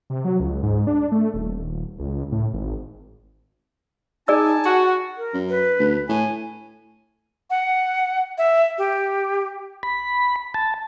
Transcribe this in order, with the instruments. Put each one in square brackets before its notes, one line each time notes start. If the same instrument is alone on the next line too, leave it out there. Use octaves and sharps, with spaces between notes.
[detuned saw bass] C3
F#3
C#2
G#2
D4
A3
D#1
C#2
A2
G#1
[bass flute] D#4 [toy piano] G#4 D5 E6 [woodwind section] G#5 A5
[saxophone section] F#4 [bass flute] F#5
[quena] A#4
[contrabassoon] F#2
[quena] B4
[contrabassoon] D2
[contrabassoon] A2 [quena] G#5
[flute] F#5
E5
G4
[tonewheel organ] B5
A5